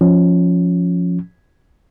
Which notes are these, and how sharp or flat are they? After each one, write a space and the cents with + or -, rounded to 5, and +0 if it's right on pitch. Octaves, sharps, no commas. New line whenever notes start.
F3 +10 C#4 +0